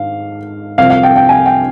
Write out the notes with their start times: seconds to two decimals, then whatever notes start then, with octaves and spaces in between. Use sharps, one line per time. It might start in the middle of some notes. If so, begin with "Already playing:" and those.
Already playing: G#2 D#3 F5
0.78 C2 C3 F3 F5
0.90 F5
1.03 G5
1.16 G5
1.29 G#5
1.46 G5